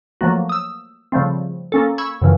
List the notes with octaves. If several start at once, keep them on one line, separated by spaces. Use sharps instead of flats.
F3 F#3 A3 A#3 F#4
D#6 E6
C#3 F3 G3 A3 C4
A#3 C#4 A4
B5 C#6 E6 G#6
F#2 C#3 E3 F3